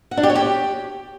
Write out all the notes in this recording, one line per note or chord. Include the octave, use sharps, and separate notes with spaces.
F#5
D4
G4
C#5
G4